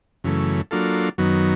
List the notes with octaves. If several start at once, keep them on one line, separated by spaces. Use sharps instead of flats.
F#2 C#3 E3 A3
F#3 A#3 D4 F4 A4
F#2 D#3 F#3 B3